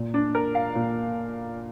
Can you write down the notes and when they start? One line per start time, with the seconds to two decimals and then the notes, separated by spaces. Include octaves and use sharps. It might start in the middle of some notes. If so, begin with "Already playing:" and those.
Already playing: A#2
0.14 D4
0.35 A#4
0.55 F5
0.75 A#2